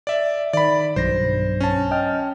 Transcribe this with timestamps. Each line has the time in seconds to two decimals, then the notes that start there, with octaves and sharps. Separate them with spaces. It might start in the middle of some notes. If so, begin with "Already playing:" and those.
0.07 D5 E5
0.53 D#3 D5 B5
0.96 B1 G2 C5 A#6
1.60 C#4 A5
1.91 D#5 G5 F6